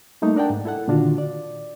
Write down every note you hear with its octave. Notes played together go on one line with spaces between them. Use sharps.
G3 A3 A#3 D#4
D4 A#4 D5 F#5 G5 A5
G#2
E4 A4 F#5
A#2 D3 D#3 D4 F4 F#4
D5